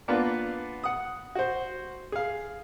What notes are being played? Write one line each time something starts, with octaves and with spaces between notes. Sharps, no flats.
A#3 B3 D4 F4 B4
F#5 D#6
F#4 C5
G#4 F5